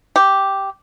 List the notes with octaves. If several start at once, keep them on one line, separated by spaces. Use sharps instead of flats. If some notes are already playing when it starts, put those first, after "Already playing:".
G4